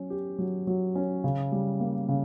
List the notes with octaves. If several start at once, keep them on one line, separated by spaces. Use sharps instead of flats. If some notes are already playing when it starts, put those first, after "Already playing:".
Already playing: F#3 C#4
G4
F#3
F#3
C#4
C#3
G3
A#3
C#3